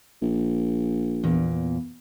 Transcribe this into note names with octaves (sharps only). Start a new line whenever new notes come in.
A#1
E2 A#2